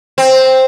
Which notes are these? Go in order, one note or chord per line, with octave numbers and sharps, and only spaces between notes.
C4